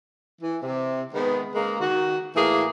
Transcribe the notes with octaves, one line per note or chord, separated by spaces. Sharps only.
E3
C3
D#3 G#3 B3
C#3 G#3 A#3 A#4
D#3 F#4
A2 E3 A#3 G#4